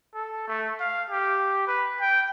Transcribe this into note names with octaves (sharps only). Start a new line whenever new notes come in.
A4
A3
F5
G4
B4
G5